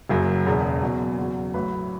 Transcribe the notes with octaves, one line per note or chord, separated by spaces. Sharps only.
F#1 F#2 C#3 F#3
E1 E2 C#3
E2 B2 F#3
E2 C#3 F#3
A1 A2 F#3 B4